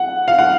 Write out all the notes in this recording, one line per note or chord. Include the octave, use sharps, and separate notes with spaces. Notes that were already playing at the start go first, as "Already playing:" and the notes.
Already playing: F#5
F5
F#5